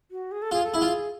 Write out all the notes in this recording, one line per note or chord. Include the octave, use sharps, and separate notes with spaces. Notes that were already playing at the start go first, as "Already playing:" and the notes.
F#4
G#4
A4
F4 G#4
A4
E4 G#4
F4